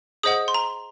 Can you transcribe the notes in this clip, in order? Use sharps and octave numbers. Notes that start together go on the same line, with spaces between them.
G#4 C5 D#5 F#5 D#6
C6
A#5